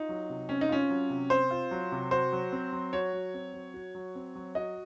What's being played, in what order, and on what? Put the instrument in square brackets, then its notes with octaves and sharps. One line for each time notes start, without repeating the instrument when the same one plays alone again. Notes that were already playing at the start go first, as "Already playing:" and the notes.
Already playing: [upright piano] D#4 [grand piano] F4
[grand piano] F#3
C3
[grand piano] C4 [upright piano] C#4
[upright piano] D#4
[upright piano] C#4 [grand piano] F4
[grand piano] F#3
C3
[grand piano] C4 [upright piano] C5
[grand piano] F4
F#3
C3
[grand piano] F#4 [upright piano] C5
[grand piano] F#3
C4
F#3
[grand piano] F#4 [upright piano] C#5
[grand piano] F#3
C4
F#3
F#4
F#3
C4
F#3
[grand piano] F#4 [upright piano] D#5